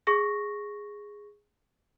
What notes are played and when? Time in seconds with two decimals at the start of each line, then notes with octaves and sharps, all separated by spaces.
0.07 G#4 C#6 A#6